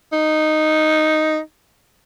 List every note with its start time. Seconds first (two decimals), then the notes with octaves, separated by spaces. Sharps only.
0.13 D#4